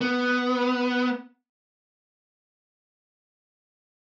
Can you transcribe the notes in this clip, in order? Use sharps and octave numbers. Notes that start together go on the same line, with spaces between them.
B3